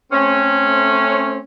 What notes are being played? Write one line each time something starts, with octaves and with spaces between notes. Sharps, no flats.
A3 C4 C#4